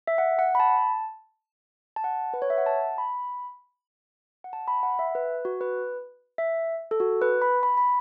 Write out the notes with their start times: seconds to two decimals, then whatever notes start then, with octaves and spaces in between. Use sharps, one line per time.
0.07 E5
0.18 F#5
0.39 F#5
0.55 B5
0.60 A5
1.96 A5
2.04 F#5
2.34 B4
2.42 C#5
2.50 E5
2.58 F#5
2.66 A5
2.98 B5
4.44 F#5
4.53 A5
4.68 B5
4.83 F#5
4.99 E5
5.15 B4
5.45 F#4
5.61 B4
6.38 E5
6.91 A4
7.00 F#4
7.22 B4
7.42 B5
7.63 B5
7.77 B5